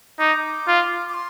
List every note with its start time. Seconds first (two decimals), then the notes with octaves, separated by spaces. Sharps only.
0.19 D#4 D6
0.67 F4
1.09 D6
1.14 C6